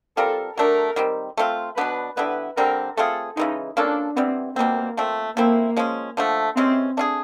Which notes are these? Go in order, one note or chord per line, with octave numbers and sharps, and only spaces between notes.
G3 C4 F4 A4 A#4
F#3 A3 D4 A#4
D#3 G3 C4
A3 C4 F4
B2 F#3 B3 D4 B4
D3 G3 B3 E4 B4
D3 G3 C4 A#4
A3 C4 F4 G#4 A4
C#3 E3 G#3 D#4
A#3 C#4 D4 F4 A4
E3 G3 B3 C4
B2 G3 A#3 C4
F3 A3 C4
F3 A3 A#3 C4 E4
F3 G#3 C#4
D3 F3 A3
C3 E3 G#3 C4 C#4
A3 D4 F4 G#4